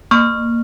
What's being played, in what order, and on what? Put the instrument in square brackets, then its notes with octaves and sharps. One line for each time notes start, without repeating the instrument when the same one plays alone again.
[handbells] A#3 C#6 F6